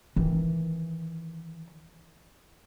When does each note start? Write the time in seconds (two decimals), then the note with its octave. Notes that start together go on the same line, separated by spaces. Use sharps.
0.16 D#3 E3